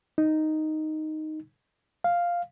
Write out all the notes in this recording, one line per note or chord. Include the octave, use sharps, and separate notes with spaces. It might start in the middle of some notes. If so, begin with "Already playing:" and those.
D#4
F5